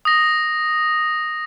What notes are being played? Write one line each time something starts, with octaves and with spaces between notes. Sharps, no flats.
D#6 A#6